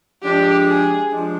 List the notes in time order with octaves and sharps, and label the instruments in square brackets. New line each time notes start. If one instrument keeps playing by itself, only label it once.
[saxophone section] F3 G#3 D4 [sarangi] G4
[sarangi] G#4
[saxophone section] F3 G#3 D4